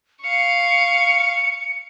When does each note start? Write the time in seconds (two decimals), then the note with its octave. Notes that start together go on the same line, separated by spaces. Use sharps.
0.23 F5 C#6 C#7